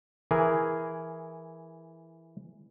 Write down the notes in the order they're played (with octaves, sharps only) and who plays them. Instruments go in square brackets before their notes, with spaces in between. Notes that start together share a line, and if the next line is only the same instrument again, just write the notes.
[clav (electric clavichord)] E3 G#4 A#4